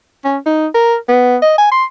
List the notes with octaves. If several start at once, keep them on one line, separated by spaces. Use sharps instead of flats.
C#4
D#4
A#4
B3
D#5
G#5
C6